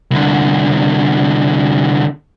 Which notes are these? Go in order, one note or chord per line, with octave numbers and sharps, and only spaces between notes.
C2 D3